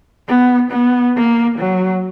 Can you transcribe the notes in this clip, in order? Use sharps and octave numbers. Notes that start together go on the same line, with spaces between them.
B3
B3
A#3
F#3